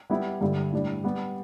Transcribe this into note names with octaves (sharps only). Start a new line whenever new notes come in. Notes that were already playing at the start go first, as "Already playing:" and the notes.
G3 B3 E4 G4
G2 D3 G3 E4
A2 G3 D4
G3 B3 G4